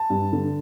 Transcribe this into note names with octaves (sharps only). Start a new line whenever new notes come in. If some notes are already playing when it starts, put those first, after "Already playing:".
Already playing: A5
G2
D3